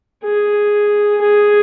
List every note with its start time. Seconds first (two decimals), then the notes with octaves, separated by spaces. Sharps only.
0.24 G#4
1.21 G#4